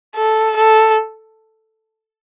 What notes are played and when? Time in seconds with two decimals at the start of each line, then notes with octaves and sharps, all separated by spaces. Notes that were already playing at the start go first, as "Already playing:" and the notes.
0.16 A4
0.57 A4